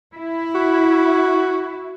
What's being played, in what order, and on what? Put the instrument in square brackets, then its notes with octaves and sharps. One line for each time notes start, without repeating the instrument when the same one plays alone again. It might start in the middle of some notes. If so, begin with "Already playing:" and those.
[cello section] E4
[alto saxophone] F#4